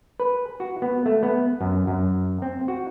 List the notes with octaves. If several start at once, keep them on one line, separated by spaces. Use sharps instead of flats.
B4
F#4
B3
A3
B3
F#2
F#2
C4
F#4